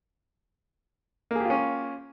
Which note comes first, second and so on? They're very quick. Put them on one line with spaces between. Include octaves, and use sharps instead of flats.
A#3 G#4 G4 F4 C#4